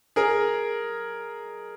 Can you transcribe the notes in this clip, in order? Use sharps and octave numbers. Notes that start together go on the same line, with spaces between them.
G#4 A#4